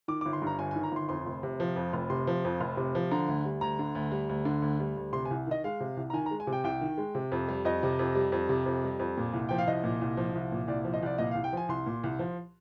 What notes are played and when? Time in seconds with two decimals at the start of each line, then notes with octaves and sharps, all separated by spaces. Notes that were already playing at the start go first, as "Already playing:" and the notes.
0.08 D#3 D6
0.21 D6
0.25 G1
0.33 C6
0.42 G2 A#5
0.59 G1 G#5
0.71 G#5
0.76 D#3
0.83 A#5
0.92 G1 C6
1.09 F2 C6
1.26 F1
1.43 C3
1.60 F3
1.76 F2
1.93 F1
2.10 C3 C6
2.27 F3
2.45 F2
2.61 F1
2.77 C3
2.95 F3
3.11 D3 A#5
3.28 D2
3.45 G3
3.61 D2 A#5
3.79 D3
3.95 D2
4.12 G3
4.29 D2
4.45 D3
4.62 D2
4.80 G3
4.96 D2
5.13 C3 C6
5.25 G#5
5.31 C2
5.47 D#3 D#5
5.64 G#3 F5
5.80 C3
5.97 C2
6.10 A#5
6.13 D#3 G#5
6.26 A#5
6.31 G#3
6.40 G#5
6.47 C3
6.53 G5
6.64 C2 G5
6.81 D#3
6.98 G#3
7.15 C3
7.32 F2
7.49 G3
7.65 F2 D#5
7.83 C3
7.99 F2
8.15 G3
8.32 F2
8.49 C3
8.66 F2
8.84 G3
8.99 F2
9.17 A#2
9.33 C2
9.49 F3 G5
9.58 F5
9.67 C2 D#5
9.84 A#2
10.01 C2
10.17 F3
10.35 C2
10.52 A#2
10.68 C2 D5
10.85 F3
10.93 D#5
11.02 C2 D5
11.18 A#2 D#5
11.31 C2 F5
11.44 G5
11.53 F3 G#5
11.69 C2 C6
11.86 A#2
12.04 C2
12.19 F3